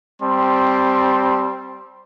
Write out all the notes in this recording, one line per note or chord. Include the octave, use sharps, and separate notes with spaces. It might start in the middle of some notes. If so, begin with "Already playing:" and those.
G3 C4 A5 C6